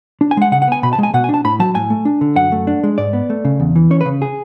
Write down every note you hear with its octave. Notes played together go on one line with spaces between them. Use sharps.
D4
G#5
G#3 F#5
C#3 F#5
F#5
B3 G#5
B2 B5
A5
G#3 G#5
B2 F#5
G#5
D4 A5
A2 B5
F#3 A5
A2 G#5
A3
D4
D3
F#2 F#5
A3
D4
G#3
G#2 D5
B3
A3
C#3
E2
E3
C#4 C#5
B4
C#3
G#4